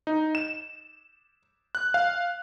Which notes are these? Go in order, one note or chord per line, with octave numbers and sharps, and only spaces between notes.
D#4
E7
F#6
F5